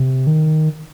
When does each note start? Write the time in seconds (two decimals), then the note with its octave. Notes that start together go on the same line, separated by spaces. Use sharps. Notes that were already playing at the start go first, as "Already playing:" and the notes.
Already playing: C3
0.27 D#3